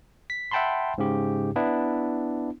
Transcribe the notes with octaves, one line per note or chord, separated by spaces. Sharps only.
B6
E5 F#5 G5 A5 B5 C6
G#2 C#3 G4
B3 D4 E4